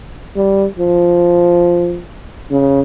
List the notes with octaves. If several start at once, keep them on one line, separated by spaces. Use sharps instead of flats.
G3
F3
C#3